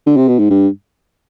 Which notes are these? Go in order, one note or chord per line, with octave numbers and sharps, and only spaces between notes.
D3
C3
B2
G#2
G2